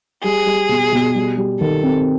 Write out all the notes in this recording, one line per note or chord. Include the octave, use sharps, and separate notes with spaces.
G3 G#4
G3
B2
B2
G3
G3
D#3 A4
C4